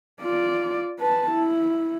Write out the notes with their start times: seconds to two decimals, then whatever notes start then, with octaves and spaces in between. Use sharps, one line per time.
0.21 F4 D5
1.00 B4 A5
1.31 E4